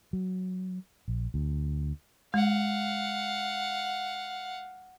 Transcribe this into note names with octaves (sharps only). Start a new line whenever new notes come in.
F#3
A#1
D2
G#3 F5 F#5